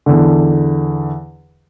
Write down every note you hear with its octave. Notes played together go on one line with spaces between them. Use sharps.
E2 D3